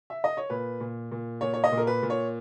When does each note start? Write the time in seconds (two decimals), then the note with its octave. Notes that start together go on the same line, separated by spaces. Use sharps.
0.10 E5
0.24 D#5
0.37 C#5
0.50 A#2 B4
0.80 A#2
1.12 A#2
1.41 A#2 C#5
1.54 C#5
1.64 D#5
1.72 A#2
1.78 A#4
1.87 B4
2.03 A#2
2.10 C#5